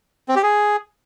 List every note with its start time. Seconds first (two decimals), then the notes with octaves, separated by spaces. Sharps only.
0.28 C4
0.36 G4
0.43 G#4